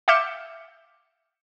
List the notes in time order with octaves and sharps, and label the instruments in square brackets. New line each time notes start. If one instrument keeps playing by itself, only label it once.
[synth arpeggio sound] E5 F5 D6 G6 C#7 E7